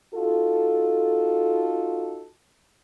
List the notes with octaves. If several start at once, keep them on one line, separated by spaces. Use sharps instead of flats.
D#4 F4 F#4 A4